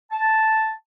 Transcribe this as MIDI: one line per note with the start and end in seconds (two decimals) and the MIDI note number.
0.11 0.72 81